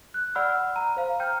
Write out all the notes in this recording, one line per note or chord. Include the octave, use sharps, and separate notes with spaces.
F#6
D5 F#5 B5 E6 F6
A#5
C5 F5
G5 A#5 F6 G6